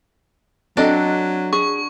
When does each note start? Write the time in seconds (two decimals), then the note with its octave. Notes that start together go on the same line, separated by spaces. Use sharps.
0.77 F#3 C4 D4 A4 D#5
1.53 G#4 C#6